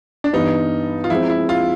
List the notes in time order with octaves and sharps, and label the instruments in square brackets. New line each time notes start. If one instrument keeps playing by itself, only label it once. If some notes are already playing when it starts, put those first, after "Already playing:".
[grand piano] D4
[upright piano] G2 E3 G3 B3 [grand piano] D#4
[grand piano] F4
[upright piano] F3 G#3 C4 [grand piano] E4
[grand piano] E4
F4